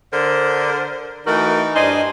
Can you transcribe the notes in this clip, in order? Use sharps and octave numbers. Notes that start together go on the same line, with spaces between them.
D3 A#4 C5
E3 A3 D#4 F#4 A#4
G2 D4 C5 D#5 G#5